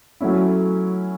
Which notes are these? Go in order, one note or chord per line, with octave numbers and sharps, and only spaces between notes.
F#3 A3 C#4 E4